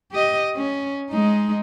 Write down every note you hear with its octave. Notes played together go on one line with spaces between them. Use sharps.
G4 D#5
C#4
G#3 D#4